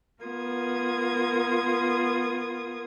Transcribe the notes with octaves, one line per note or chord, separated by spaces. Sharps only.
B3 F4 A#4 D#6 G#6